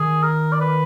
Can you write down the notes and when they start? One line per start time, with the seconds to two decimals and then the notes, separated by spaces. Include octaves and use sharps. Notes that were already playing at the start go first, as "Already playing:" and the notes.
Already playing: D#3 G#4
0.23 A#4
0.52 D5
0.60 B4